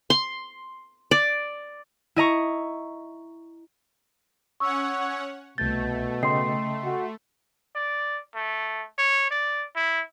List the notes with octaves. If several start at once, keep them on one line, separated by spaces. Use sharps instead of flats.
C6
D5
E4 D#5 A#5 C#6
C#4 C#5 F#5 C#6 E6
C2 B2 A3 G6 A6
C#3 D#5 G5 C6 C7
F#4
D5
A3
C#5
D5
E4